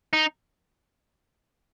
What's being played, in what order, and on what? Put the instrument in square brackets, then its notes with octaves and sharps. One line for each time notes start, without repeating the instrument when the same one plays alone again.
[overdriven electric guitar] D#4